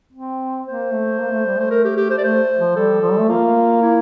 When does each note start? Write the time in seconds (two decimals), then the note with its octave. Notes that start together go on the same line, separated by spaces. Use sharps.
0.13 C4
0.66 A#3 C5
0.92 A3
1.19 A#3
1.31 A3
1.45 G3
1.58 A3 C5
1.71 A#4
1.84 G4
1.97 G4
2.11 C5
2.18 D5
2.24 A3 C5
2.59 F3
2.76 G3 A4
3.01 F3
3.11 G3
3.19 A3
3.29 A#3 F4
3.82 E4